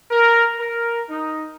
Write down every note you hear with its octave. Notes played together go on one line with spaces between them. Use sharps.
A#4
A#4
D#4